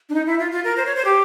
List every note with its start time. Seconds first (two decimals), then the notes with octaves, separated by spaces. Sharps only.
0.09 D4
0.14 D#4
0.26 E4
0.39 F4
0.52 F4
0.64 A#4
0.77 C5
0.86 C#5
0.96 C5
1.05 G4